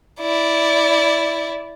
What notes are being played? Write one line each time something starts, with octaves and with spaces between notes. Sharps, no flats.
E4 D5